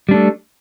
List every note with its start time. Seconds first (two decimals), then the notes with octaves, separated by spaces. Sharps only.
0.09 G3
0.11 D4
0.14 A3